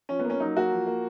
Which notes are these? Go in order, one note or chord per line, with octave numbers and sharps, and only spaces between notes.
F3 C#4
B3
A#3
C#4
F#3 D#4
A#3 F#4
F3
A#3